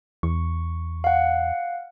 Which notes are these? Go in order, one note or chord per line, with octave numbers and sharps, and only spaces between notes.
E2 C#6
F5 F#5